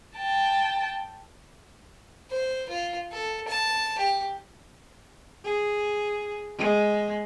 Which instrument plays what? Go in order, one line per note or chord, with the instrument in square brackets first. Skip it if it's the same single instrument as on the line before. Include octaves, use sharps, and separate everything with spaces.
[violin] G5 A5
[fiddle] C5
F4
A4
A5
G4
[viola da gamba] G#4
G#3